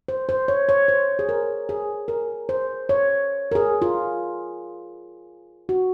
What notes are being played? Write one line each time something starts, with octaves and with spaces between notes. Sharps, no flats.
C5
C5
C#5
C#5
C5
G#4
A#4
G#4
A#4
C5
C#5
A#4
G#4
F4
F#4